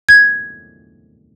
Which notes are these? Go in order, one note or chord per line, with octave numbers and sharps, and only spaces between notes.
G#6